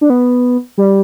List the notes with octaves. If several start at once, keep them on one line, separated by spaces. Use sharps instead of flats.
D4
B3
G3